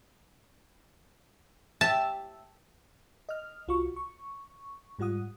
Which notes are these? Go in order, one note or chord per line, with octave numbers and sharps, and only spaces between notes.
G4 E5 A5
D#5 F6
C2 F4 F#4 C#6
C#6
G#2 G3 F4 F#5 D#6